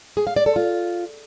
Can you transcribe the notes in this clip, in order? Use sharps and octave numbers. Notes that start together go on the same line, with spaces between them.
G#4
F5
D5
A4
F4